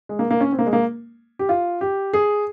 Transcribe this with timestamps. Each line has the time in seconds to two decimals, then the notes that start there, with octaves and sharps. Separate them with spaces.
0.09 G#3
0.19 A#3
0.31 A#3
0.41 C#4
0.52 C4
0.59 A#3
0.66 G#3
0.73 A#3
1.39 G4
1.49 F4
1.81 G4
2.13 G#4